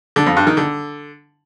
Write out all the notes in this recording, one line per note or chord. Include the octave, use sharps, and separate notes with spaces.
D3
F2
G2
D#3
D3